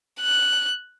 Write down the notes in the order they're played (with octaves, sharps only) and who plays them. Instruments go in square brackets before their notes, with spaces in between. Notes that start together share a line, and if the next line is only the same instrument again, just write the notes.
[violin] F#6